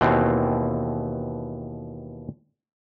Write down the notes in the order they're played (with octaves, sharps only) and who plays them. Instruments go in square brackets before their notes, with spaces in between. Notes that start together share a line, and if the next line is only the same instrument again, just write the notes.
[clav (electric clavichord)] D#2 B2 E3 C4